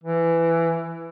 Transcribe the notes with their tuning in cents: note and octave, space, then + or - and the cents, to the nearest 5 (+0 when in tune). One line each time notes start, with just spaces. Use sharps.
E3 +15